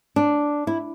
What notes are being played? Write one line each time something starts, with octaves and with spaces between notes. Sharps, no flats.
D4
E4